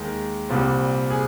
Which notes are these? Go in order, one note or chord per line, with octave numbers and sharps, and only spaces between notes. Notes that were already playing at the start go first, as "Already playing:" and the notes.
Already playing: D#2 D#3 G#3
C2 A#2 G3 C4 C5
G#4